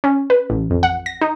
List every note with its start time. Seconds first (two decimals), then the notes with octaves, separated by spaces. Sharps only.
0.04 C#4
0.30 B4
0.50 A1
0.70 F2
0.83 F#5
1.06 A#6
1.21 D#4